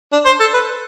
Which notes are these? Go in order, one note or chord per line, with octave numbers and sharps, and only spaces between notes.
D4
C5
A4
B4